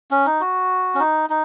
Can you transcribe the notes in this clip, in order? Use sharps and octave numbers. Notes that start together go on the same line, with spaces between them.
C#4
D#4
F#4
C#4
D#4
D#4